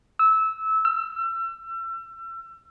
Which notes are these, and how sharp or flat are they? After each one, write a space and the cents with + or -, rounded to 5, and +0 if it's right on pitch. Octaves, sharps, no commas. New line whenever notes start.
E6 -20
E6 +35